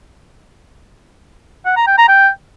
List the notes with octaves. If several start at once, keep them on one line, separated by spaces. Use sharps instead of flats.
F#5
A#5
G5
A#5
G5